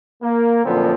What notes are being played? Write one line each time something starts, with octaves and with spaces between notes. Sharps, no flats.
A#3
F#2 A#2 D3 F3 B3 C4